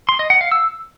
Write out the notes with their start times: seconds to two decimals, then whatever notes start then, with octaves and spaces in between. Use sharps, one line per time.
0.09 C6
0.19 D#5
0.30 F#5
0.41 F5
0.52 E6